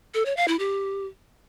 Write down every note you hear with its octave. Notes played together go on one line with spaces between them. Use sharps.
A4
C#5
F5
E4
G4